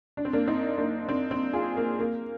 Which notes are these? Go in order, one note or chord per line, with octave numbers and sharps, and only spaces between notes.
D4
C4
A#3 D4
C4 D#4
A#3 D4
C4
C4
F4 G#4
A#3
A#3